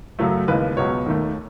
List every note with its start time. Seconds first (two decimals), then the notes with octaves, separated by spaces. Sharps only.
0.19 F#2 C#3 F#3 A3
0.48 D#2 C#3 E3 G#3 B3 B4
0.77 C#2 B2 F#3 B3 C#5
1.06 D#2 D#3 A3